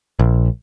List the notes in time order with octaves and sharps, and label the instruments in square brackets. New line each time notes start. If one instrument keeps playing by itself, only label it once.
[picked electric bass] A#1